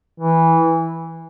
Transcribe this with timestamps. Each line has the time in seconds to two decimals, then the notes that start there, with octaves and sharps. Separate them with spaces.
0.20 E3